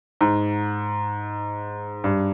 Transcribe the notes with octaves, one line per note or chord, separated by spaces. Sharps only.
G#2
G2